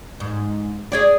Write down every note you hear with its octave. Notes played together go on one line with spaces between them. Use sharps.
G#2
G#4 C#5 D5